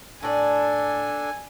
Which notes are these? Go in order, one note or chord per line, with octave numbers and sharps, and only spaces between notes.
A2 D4 A4 D5 G#5